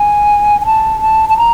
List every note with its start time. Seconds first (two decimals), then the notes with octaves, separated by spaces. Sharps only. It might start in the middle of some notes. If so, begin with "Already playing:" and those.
Already playing: G#5
0.61 G#5
0.66 A5
1.01 A5
1.29 A5
1.38 A#5